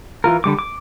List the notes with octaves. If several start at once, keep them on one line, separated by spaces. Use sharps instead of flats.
E3 F4 A#4
D3 G3 D6
D6